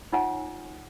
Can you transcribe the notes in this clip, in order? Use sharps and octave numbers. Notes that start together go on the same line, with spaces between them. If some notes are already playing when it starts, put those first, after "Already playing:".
D#4 F4 C#5 F#5 G#5